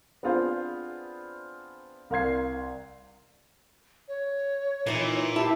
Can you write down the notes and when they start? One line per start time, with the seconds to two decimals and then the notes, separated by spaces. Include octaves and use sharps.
0.23 B3 C4 D4 F4 G#4 C5
2.10 C2 A#4 F5 C6 G#6 C7
4.08 C#5
4.86 A#2 E3 D#4 E4
5.36 E4 G4 A5